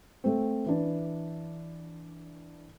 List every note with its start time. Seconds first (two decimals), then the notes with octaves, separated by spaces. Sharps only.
0.24 A3 C4
0.66 E3 D4